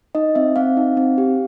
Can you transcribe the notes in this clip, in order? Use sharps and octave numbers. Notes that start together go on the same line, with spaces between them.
D#4 D#5
C4 E5
C4 F5
D#4
C4
G4